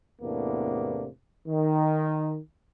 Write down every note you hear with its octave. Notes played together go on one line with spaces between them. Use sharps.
E2 A2 C3 A#3 B3 D4
D#3